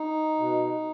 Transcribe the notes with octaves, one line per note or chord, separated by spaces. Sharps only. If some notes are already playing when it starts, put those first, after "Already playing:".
Already playing: D#4
B2